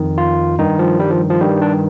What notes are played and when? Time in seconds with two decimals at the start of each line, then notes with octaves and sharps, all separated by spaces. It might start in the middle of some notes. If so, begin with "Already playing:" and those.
Already playing: F2 D#3
0.18 F4
0.59 G2 D#3 D#4
0.79 F3
1.00 G3
1.10 F3
1.30 F3
1.41 G2 D#3 G3
1.62 D4